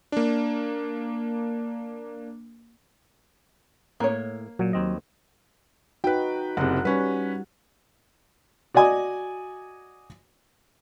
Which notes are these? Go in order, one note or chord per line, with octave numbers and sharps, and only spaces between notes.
A#3 D4
A2 A#3 C#5
A#2 F#3
D#2 C4 D#5
D#4 F#4 B4 G5
F#1 C3 F#5
G3 C#4 B4
F#4 D5 D#5 G#5 D#6